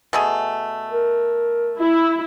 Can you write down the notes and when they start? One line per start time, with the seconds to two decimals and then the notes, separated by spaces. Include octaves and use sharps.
0.13 B2 A3 G#4
0.90 A#4
1.80 E4